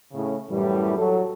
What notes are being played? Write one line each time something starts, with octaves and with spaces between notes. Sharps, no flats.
A2 C#3
F#2 A2 E3 G3
F#3 A4